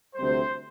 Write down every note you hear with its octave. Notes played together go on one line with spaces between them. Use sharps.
D2 C3 G3 C4 C5